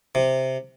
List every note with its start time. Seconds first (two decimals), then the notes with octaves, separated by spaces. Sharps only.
0.15 C3